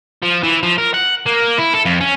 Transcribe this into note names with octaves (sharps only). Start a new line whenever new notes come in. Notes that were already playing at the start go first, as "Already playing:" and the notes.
F3
E3
F3
A#4
F#5
A#3
E4
A4
F2
C#4